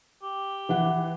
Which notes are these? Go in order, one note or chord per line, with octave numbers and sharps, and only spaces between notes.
G4
E3 F#5